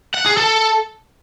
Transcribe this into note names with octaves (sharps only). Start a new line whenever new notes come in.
F#5
G#4
A4